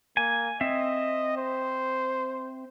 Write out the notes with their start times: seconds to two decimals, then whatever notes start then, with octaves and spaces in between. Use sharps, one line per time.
0.17 A#3 G#5
0.61 C4 D#5 E5
1.37 C5